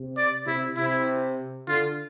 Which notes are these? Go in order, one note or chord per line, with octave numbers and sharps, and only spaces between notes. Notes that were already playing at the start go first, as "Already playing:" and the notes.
Already playing: C3
D5
C3 E4
C3 E4
D3 F4